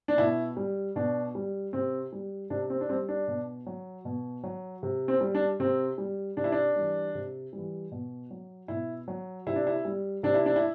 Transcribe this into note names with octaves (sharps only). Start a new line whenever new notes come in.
D4
B2 E4
G3
B2 D4
G3
C3 C4
G3
C3 D4
C4
D4
G3 C4
D4
B2
F#3
B2
F#3
C3
C4
G3
D4
C3 C4
G3
C3 D4
E4
D4
E3 G3
C3
E3 G3
B2
F#3
B2 E4
F#3
C3 E4
D4
E4
G3
C3 D4
E4
D4
E4